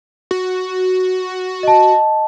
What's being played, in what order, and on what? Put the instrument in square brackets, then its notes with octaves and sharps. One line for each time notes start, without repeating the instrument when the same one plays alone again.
[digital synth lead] F#4
[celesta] D#5 A5